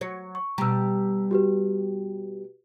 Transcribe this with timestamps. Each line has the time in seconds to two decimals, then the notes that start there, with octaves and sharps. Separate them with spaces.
0.01 F#3 C#5
0.35 C#6
0.58 B2 G3 A#5 E6
1.31 F#4 G4 B4